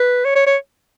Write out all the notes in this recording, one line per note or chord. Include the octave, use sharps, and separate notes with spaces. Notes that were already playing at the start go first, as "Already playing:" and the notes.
Already playing: B4
C#5
C#5
C#5